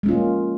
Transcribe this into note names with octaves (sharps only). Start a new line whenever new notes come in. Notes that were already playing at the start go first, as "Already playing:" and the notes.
G#3 A#3 C#4 F4